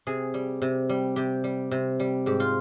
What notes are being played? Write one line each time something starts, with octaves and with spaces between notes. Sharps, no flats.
C3 G#4
G3
C3
G3
C3 G4
G3
C3
G3
G#2 G4
F4